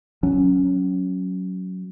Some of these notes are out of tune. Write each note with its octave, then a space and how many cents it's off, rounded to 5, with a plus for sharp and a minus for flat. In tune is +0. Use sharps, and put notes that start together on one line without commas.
F#3 +0 C#4 +0